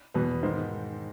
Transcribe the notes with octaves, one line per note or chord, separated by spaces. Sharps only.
E2 B2 B4
G#2 D#3 C5